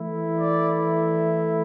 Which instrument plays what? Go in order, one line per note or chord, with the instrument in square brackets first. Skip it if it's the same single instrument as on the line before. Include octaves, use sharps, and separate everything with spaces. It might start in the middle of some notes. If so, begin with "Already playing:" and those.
Already playing: [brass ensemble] E3 A3 E4
D5